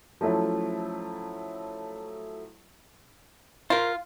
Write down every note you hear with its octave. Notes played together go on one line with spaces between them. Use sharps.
F3 F#3 A3 C#4 E4
F4 A#4 C5